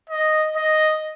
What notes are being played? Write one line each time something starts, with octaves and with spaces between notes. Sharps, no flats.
D#5
D#5